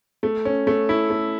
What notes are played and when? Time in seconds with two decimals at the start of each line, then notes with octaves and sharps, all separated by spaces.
0.23 A3
0.45 C#4
0.67 A3
0.89 E4
1.10 A3